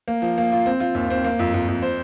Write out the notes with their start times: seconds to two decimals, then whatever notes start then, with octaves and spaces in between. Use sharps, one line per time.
0.08 A#3
0.22 F3
0.38 A#3
0.52 F4
0.66 C4
0.80 F4
0.95 D#2
1.10 C4
1.25 A#3
1.39 F2
1.54 F2
1.68 F2
1.83 C5